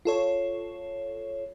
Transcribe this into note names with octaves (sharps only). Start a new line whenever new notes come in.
F4 A4 C#5